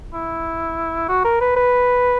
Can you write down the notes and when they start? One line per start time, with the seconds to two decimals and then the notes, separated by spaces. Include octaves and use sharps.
0.14 E4
1.08 F#4
1.24 A#4
1.41 B4
1.56 B4